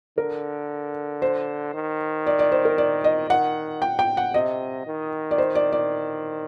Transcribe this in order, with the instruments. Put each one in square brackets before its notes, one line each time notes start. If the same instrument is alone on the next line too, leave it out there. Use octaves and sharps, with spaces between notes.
[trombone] D3 [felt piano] A#4
[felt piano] C5
[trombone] D#3
[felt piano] D5
D5
C5
A#4
D5
D#5
[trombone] D#3 [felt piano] F#5
[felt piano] G5
G5
F#5
[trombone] C3 [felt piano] D#5
[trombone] D#3
[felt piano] D5
C5
D5
D5